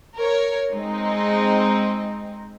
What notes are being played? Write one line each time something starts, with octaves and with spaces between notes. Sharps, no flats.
A#4 C#5
G#3 C4 D#4